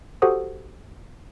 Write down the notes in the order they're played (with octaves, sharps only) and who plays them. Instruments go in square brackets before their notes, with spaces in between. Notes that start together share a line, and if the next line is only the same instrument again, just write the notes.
[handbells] F#4 G4 A4 C5 F#5 D#6